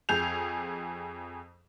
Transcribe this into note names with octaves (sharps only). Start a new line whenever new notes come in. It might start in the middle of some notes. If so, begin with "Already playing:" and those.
F2 G#4 G6 F7